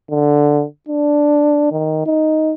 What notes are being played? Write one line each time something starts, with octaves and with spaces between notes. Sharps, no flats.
D3
D4
D#3
D#4